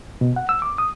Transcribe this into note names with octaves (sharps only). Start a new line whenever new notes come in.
B2
F#5
E6
D6
D#6